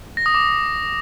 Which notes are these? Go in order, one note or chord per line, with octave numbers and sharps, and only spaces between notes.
A#6
D#6
D6